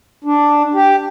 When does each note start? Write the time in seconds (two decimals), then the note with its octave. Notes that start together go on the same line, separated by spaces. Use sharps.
0.24 D4
0.74 G4